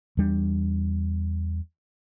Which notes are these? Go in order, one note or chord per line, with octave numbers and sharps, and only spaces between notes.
E2 G3 D4